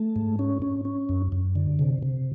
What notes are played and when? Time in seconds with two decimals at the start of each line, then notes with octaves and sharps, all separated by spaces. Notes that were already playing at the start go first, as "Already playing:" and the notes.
Already playing: A3
0.16 G#2
0.39 C#4
0.62 C#4
0.85 C#4
1.09 F#2
1.32 F#2
1.55 D3
1.79 C3
2.02 C3